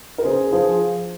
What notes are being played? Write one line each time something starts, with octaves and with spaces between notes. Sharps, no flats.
A#4
C#3 G#4 C5
F3 G#4 C5